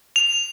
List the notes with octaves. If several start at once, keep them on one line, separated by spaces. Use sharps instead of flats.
F7